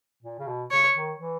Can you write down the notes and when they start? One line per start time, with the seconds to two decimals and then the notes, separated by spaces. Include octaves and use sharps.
0.23 A#2
0.39 C#3
0.47 B2
0.71 C#3 C#5
0.95 D#3
1.19 E3